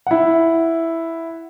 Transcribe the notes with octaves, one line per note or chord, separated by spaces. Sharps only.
E4 F#5